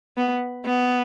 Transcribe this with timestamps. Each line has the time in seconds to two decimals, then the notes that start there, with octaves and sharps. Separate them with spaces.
0.17 B3
0.65 B3